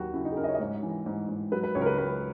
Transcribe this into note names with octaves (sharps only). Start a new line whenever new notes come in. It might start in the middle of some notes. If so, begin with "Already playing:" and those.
Already playing: D#2 F#3 F#4
C#3 E4
D#4
G#4
C#3 A#4
D#5
C#5
D#5
G#2 C#5
E3
G#2
G#2
F#3 B4
B4
C#2 C#5
A#4
B4
C#2 B4